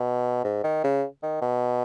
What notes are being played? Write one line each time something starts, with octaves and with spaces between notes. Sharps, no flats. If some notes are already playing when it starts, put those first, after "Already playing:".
Already playing: B2
G#2
D#3
C#3
D#3
B2